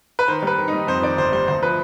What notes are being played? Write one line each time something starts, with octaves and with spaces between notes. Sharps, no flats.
B4
D#3 C5
G3 B4
D#3
D#4
G3
F2 C5
D#3 D5
G1 C5
G3 C5
D2 C5
F3 B4